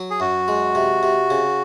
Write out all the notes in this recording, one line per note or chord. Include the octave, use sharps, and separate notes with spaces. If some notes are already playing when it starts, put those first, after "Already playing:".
Already playing: F#3
G#4
F#2 F#4
G#3
C3
C3
C#3